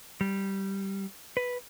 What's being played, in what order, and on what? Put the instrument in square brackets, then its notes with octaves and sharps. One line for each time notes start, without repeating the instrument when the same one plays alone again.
[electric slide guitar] G3
B4